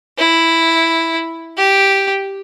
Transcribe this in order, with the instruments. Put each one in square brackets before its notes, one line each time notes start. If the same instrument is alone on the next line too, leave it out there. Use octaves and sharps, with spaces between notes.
[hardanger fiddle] E4
G4